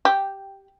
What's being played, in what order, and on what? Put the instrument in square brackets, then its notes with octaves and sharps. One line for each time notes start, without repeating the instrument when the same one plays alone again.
[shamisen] G4